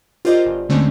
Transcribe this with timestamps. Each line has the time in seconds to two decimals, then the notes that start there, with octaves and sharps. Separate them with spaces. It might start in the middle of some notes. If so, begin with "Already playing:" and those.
0.25 F4 G4 A#4 C5 D5 D#5
0.45 G1
0.69 D#2 D3 G#3 A3 C4 C#4